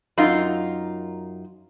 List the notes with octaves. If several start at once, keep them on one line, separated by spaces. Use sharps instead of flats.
F#2 D#4 F4 A#4